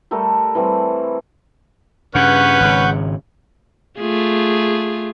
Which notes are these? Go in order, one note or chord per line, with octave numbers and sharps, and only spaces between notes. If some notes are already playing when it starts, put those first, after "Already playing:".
G3 A3 A4 A#4
E3 G3 C4
G2 C#3 C#4 B4 F#5 C#6 G6
G#1 C#3
A3 F4 G#4